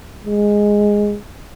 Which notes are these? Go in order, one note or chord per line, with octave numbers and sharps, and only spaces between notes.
G#3